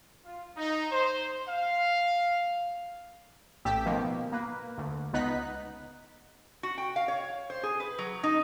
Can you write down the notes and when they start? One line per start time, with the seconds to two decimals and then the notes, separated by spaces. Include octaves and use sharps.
0.24 F4
0.57 D#4
0.92 C5
1.49 F5
3.65 A1 A3 G4 E6 B6
3.86 B2 D#3 F3 A#3
4.32 A#3 B4
4.78 D2
5.13 C#2 B3 D#4 F#6 B6
6.63 F#4
6.78 G5
6.96 F5
7.08 C#5
7.50 C5
7.63 G#4
7.80 B4
7.98 F#3
8.23 D#4